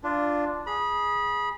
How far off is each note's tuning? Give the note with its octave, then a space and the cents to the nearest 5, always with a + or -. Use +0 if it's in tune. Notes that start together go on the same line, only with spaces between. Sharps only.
D4 +0 F4 -10
G#4 +0 B5 -30